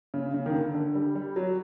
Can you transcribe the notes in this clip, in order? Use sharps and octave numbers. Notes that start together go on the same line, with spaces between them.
C#3
C#3
D#3
D3
D3
G3
G3
F#3